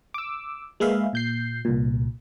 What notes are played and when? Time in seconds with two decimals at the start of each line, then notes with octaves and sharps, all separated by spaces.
0.14 D6 E6
0.80 G#3 A#3 G#4 B4 E5 F5
1.13 A#2 G6 C7
1.65 C2 A#2